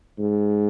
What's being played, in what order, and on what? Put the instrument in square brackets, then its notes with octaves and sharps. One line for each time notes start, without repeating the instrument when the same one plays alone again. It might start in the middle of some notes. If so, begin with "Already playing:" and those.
[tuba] G#2